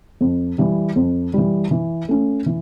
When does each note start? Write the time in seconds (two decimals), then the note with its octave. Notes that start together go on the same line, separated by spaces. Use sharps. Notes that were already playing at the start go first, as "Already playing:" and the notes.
0.21 F2
0.58 E3 G3
0.96 F2
1.34 E3 G3
1.71 E3
2.08 A3 C#4
2.46 E3